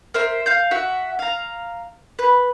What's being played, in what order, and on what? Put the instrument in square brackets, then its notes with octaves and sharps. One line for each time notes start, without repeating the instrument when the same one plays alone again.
[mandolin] A#4 C5 E5
F5 G6
F#4 E5 F#5
F5 A#5
B4